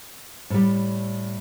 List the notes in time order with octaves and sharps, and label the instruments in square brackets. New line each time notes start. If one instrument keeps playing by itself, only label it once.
[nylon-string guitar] A2 G3